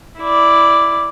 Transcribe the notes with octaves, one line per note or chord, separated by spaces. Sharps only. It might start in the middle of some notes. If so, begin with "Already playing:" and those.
E4 D5